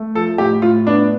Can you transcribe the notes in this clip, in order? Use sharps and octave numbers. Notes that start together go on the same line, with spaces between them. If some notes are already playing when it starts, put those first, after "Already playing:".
Already playing: A3
F3 A4
A2 G4
A2 F4
B3 D4